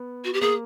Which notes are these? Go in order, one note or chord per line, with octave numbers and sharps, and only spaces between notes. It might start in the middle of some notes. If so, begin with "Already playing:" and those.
Already playing: B3
F#4
G4
A#3 G#4